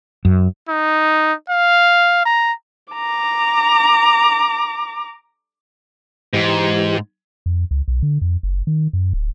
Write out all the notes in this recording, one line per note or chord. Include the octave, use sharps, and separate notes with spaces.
F#2
D#4
F5
A#5
A#5 D6
G#2 E3 G4
F2
C#2
B1
D3
F2
F#1
D#3
F#2
D1